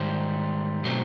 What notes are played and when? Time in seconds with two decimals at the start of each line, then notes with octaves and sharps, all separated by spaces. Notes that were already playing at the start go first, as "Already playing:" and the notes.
Already playing: G#2 D#3 G3 C5
0.84 B2 F#3 A3 C4